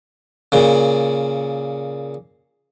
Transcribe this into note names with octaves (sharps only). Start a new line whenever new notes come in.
A#2 C#3